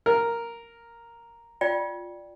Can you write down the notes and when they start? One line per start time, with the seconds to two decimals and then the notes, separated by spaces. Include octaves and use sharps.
0.06 A#4
1.61 F4 D5 G5